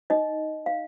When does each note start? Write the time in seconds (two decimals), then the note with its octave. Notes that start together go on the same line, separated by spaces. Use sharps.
0.10 D#4 D#5
0.66 F5